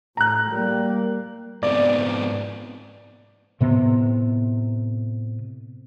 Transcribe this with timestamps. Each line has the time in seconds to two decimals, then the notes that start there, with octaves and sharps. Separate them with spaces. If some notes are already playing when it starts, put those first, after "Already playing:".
0.17 A2 A#5 F#6
0.51 G3 A#3
1.63 G#2 B3 C4 D5
3.61 A2 C3 B3